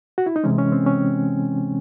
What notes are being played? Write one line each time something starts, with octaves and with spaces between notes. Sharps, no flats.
F#4
E4
D#4
C3 E3 G#3 C#4
C#4
C4
C#4